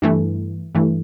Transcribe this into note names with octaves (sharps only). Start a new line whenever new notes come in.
G2 E3 A3
G2 E3 A3